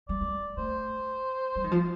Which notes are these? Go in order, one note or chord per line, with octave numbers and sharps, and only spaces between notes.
G3 D5
A3
A3 C5
G3
D#3
F3